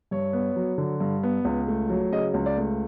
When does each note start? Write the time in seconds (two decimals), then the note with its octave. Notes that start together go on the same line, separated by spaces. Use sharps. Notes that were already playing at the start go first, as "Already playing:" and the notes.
0.11 G2 C#5
0.33 B3
0.56 F#3
0.78 D3
1.00 G2
1.23 B3
1.45 C#2
1.68 A3
1.89 F#3
2.12 C#3 D#5
2.34 C#2
2.46 D5
2.57 A3